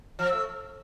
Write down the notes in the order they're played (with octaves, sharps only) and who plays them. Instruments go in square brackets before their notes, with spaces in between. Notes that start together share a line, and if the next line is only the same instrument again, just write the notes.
[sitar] F3 [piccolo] F6
[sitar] A3 [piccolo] E6